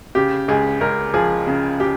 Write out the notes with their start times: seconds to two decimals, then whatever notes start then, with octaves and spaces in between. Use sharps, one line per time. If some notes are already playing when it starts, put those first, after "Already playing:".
0.15 C#3 G4
0.48 C#2 G#4
0.81 C#2 A#4
1.14 F3 G#4
1.47 C#3
1.80 G4